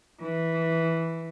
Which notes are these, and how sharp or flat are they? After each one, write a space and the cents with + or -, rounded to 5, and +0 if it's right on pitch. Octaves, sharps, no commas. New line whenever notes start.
E3 -5